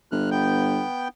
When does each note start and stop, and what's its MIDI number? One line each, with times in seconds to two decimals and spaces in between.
0.12 0.83 31
0.12 0.30 89
0.12 0.30 90
0.31 1.08 59
0.31 1.08 79
0.31 1.08 91